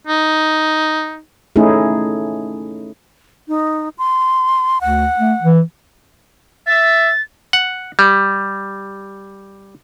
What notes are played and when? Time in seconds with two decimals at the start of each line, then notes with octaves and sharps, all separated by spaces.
0.07 D#4
1.56 A3 C#4 D#4 E4 G#4
3.48 D#4
3.98 C6
4.81 D2 F#5
5.19 A3
5.41 E3
6.67 E5 A6
7.53 F#5
7.99 G3